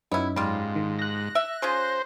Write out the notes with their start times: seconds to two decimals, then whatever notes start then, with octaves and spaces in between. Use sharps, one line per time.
0.11 F#2 B3 C#4 D#4 E4
0.36 G#2 G3 F4
0.76 D#3
0.99 F#6 A#6
1.35 E5
1.62 C#4 F4 G#4 C5